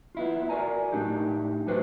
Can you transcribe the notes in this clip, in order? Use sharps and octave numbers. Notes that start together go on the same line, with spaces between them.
B3 E4 F4
F#4 A#4 D5 G#5 A#5
A2 D4 D#4 G4
G3 A3 F#4 B4 C5